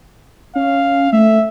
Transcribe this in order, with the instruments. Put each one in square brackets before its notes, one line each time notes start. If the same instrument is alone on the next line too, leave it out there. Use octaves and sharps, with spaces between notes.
[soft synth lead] C#4 [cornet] F5
[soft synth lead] A3 [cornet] E5